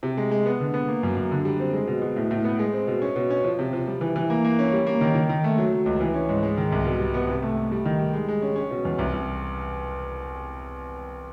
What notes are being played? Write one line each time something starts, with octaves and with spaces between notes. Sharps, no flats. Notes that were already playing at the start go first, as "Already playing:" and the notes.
C3
G#3
G#3
B3
D3
B3
A#3
F#2
F#2
D3
G3
C4
G#3
B2
B2
A2
A2
B3
G#3
C4
B2
C#4
B2
C#4
F3
C3
F3
G3
E3
E3
A#3
A#3
C#4
G3
A#3
D#3
D#3
D#3
A3
F#3
F#3
C#2
E3
C#4
G#2
G#3
D#3
C2
B2
G3
B3
C3
A3
A3
G3
D#3
G3
G#3
G#3
C#4
C#4
B2
E2
C2
C2